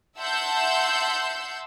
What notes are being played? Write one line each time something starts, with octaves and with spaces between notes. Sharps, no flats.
E5 F#5 A5 C6 E6 G6